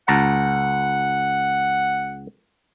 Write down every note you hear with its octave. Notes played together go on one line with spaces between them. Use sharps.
C#2 F#5 A5 A#5